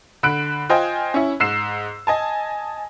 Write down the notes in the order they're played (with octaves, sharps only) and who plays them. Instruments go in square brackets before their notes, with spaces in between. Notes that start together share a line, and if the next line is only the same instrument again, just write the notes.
[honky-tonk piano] D3 B5 F#6 D7
F4 C5 D#5 G5 G#5
C#4 E4
G#2 E6 C7 E7
D#5 G#5 A5